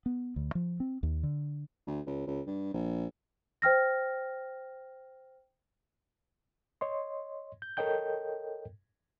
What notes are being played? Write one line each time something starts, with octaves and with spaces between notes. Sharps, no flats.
B3
D2
F3
C4
D#2
D3
D2
C#2
C#2
G2
A#1
C5 G5 F6 A#6
C#5 D#5 C6
G6
A4 A#4 C#5 D#5 G5 G6